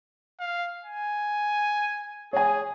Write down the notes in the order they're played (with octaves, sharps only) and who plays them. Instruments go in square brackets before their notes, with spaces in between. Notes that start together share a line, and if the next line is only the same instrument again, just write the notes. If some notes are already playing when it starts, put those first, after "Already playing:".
[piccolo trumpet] F5
G#5
[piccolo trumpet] G#4 [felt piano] C#5 G#5